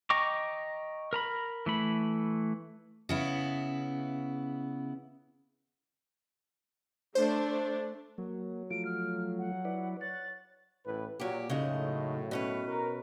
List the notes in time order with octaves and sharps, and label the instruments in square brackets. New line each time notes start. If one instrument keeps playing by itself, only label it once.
[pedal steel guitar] D#5 G5 A#5 C#6 D6
A#4 A#5 B5
E3 A3 B5
[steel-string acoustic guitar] C#3 B3 E4
[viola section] A3 D4 [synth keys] C5
[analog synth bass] F#3 [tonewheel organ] A#3
[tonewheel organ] F3 A3 F4 [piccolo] D7
[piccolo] F6
F#5
[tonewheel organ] E4 B4 D5
[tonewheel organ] C#5 F#5 [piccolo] A6
[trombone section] A1 A2 B4
[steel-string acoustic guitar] A#2 G4 [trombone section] F#3
[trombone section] F#2 A2 [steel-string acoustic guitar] C#3 G#3 D#4
[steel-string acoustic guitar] B2 C#4 B4
[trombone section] A#4